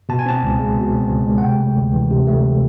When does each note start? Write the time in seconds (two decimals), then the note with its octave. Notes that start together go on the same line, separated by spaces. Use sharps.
0.09 B2 A5
0.19 G#5
0.26 C4 A5
0.43 C#2
0.59 G#3
0.77 B2
0.93 C4
1.10 C#2
1.26 G#3
1.38 F#5
1.43 C3 G5
1.60 A3
1.77 D2
1.93 E3
2.10 C3
2.27 A3